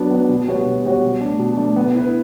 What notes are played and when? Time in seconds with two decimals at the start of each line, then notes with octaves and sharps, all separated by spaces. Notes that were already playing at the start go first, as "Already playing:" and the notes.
Already playing: F#3 B3 D4
0.11 B3 D4
0.29 B2
0.48 G3 B3 F#4 C#5
0.66 B2
0.85 G3 B3 F#4 C#5
1.03 B2
1.21 A3 D4
1.39 B2
1.57 A3 D4
1.76 B3
1.95 E4 B4